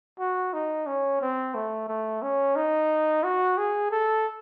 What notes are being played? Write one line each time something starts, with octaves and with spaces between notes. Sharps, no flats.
F#4
D#4
C#4
C4
A3
A3
C#4
D#4
F#4
G#4
A4